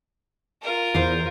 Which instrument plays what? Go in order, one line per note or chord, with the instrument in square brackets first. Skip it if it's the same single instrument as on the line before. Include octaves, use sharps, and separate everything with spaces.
[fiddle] F4 A#4
[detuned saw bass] E2 [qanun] C5 F5